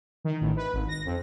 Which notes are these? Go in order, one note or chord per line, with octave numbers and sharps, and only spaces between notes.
D#3
A1
B4
G#1
A#6
F2